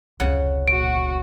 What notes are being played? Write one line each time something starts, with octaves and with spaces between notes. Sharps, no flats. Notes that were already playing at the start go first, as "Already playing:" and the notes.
F1 C#2 C#3 F#5
A#1 F#4 D7